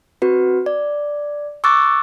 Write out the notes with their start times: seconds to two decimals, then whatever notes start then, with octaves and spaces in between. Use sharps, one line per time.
0.22 C4 F#4 B4
0.66 D5
1.64 C#6 D6 E6 F#6 A6